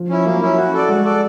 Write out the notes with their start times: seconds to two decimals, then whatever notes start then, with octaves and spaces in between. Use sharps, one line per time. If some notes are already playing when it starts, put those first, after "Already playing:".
Already playing: F3
0.09 C#4 E4
0.25 F#3 A#3
0.41 C#4 E4
0.57 F#4
0.74 A4 D5
0.89 G#3 F#4
1.05 A4 D5